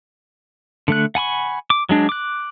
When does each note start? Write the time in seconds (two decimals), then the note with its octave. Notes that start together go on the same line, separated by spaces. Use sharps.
0.88 D3 A3 F#6
1.15 F#5 G#5 B5 C#6
1.70 D6
1.89 F#3 G#3 D4
2.09 D6 F#6